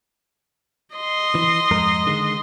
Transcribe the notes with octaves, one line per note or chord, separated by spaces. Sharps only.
D#5 C6
E3
F2 G#2 A#4
D3 D#3 G#3